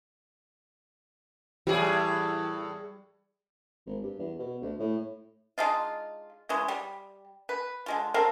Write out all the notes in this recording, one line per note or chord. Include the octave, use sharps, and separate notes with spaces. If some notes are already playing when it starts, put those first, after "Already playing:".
E2 A2 G3 G#4
G#1
G2
E2
B2
D2
A2
G#3 D4 D#4 F4
C#3 E3 G#3
G3
B4
D3 G#3 F4
C4 A4 A#4 F5